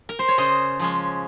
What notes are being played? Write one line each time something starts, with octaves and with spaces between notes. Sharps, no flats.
A#4
C5
C#5
C#3 C5 D#5
F3 G#3 C#4